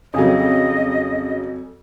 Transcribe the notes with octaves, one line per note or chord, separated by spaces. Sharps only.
F2 C#3 F#3 A4 D#5 G#5 D#6